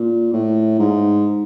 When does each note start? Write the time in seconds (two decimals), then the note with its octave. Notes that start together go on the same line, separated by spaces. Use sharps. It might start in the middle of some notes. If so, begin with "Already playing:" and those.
Already playing: A#2
0.33 A2
0.78 G#2